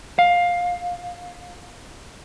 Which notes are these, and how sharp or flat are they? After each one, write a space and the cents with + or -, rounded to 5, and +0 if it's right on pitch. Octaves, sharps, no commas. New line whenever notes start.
F5 +15